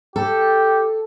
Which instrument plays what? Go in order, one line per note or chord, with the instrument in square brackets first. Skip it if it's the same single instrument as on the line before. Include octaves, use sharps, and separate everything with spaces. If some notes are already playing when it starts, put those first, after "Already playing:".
[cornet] G4 [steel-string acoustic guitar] A4